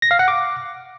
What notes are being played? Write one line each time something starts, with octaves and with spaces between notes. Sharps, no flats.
A#6
F5
F#5
D6